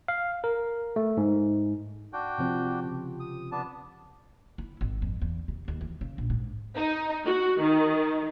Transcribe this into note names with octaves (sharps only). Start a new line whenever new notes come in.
F5
A#4
A3
G#2
D4 F#4 G5
C3 F3 C4
C#3
D#6
B3 D4 A5
E4
G#1
F2
E2
C3
D#2
E3
C#3
A#1
G#2
D#4
F#4
D#3